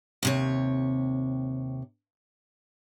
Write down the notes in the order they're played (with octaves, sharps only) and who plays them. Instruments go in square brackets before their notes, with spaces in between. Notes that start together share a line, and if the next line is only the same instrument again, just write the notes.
[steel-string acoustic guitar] D#2 C3 C#5